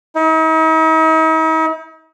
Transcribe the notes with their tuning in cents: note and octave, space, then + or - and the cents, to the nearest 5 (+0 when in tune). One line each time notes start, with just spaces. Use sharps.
D#4 +45